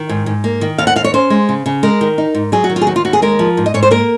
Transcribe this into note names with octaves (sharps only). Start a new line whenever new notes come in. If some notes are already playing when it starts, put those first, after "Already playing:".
Already playing: D#3
G#2
G#2
A#3
D#3
D#2 F5
F#5
D#2 F5
C#5
C#4 C5
G#3
C#3
C#3
G#3 A#4
D#3
D#4
G#2
F#3 G#4
F#4
D#3
F4
G#4
D#2 F#4
F4
D#2 F#4
G#4
G#3 A#4
F3
G#2
D#5
G#2 C#5
C5
A#3 A#4